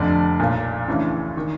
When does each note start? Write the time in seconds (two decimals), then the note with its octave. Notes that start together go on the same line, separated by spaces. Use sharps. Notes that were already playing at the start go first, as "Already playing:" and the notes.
Already playing: F1 F2 D3 D5
0.40 B1 A#2
0.88 D2 C#3 E3
1.37 D#3